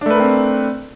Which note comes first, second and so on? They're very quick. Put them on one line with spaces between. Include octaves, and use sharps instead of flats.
D4 A3 B4 A#4 C4